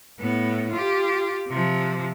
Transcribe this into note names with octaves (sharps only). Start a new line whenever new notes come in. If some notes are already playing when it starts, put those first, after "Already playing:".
A2 B3
F4 G4
C3 F3